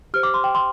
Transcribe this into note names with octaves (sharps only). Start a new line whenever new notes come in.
G4 C5 F6
D6
C6
G5
C6